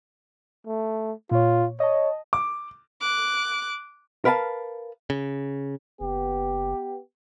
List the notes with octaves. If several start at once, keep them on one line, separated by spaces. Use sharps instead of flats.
A3
A#2 F4 C#5
C#5 D#5 A5
D6
D6 F#6
A#4 B4 F5 G#5 A5
C#3
F#1 B3 G4